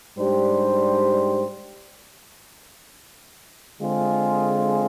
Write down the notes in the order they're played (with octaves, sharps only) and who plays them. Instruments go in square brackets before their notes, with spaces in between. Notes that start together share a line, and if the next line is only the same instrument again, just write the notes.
[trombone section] G#2 G3 D4 G4 C5
D3 G#3 C4 F4 G#4